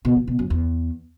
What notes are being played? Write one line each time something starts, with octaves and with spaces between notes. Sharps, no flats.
B2
E3
B2
F#2
E2